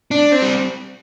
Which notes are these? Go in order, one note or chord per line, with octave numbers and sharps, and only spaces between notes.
D4
C4
G3